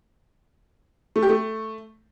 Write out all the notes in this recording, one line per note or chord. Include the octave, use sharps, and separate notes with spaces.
A3
G4
A3